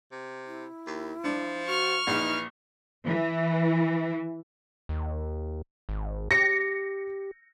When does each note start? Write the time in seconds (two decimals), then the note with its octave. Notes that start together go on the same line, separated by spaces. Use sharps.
0.12 C3
0.46 E4
0.87 D#2
1.24 F3 D4
1.67 F#4 C#6 F6
2.07 A#1 E3 D#4
3.06 E3
4.89 D#2
5.89 G#1
6.31 G4 A#6 C#7